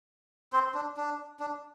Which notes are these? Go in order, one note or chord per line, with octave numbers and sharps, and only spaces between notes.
C4 C5
D4
D4
D4